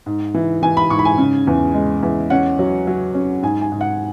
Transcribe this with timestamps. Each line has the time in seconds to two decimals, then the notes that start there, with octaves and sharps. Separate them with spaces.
0.06 G#2
0.34 E3
0.62 E3 G#5
0.77 B5
0.90 G#2 C#6
0.99 B5
1.05 G#5
1.18 C#3
1.47 E2
1.74 G#3
2.03 E2
2.30 C#4 F#5
2.59 F#3
2.87 F#3
3.14 C#4
3.42 G#2 G#5
3.61 G#5
3.72 G#2
3.81 F#5